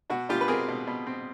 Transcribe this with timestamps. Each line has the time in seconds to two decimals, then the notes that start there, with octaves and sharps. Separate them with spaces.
0.10 B2 F#4
0.29 B2 F4 G4
0.41 B4
0.48 C4 G#4 A#4
0.68 B2
0.87 B2
1.07 C4